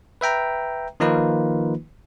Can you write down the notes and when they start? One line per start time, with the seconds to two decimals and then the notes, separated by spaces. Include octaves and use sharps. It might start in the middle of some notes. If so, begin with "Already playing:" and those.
0.21 B4 E5 G5 A#5
1.00 D#3 F3 A#3 D#4 F4 B4